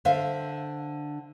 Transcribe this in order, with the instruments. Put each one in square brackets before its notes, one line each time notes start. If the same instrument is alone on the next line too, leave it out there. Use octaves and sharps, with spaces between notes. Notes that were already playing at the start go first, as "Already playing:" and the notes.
[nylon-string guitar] D3 C5 E5 F5